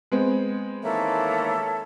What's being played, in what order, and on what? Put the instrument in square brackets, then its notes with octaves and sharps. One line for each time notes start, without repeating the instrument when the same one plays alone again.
[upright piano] G#3 B3 C4
[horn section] D#3 E3 A#3 [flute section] A4 C#5 E5